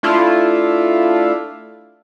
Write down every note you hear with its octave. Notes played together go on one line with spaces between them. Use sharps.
A3 D4 E4 F4